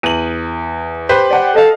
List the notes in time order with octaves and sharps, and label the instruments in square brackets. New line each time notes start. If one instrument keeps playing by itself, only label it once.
[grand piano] E2 [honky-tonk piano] D#7 F#7
[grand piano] G4 B4 C5 [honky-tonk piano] G6 B6
[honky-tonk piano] D5 F#5 G5
[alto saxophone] A4 [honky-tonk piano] D#5 F5